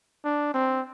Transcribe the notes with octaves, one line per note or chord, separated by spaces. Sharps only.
D4
C4